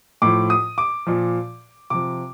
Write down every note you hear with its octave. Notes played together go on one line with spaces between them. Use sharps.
A2 F3 D6
D#6
D6
A#2 F3
C3 F3 D6